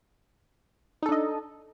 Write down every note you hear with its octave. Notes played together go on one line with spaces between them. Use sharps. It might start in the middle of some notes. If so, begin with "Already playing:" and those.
D4 D#4 A4 D#5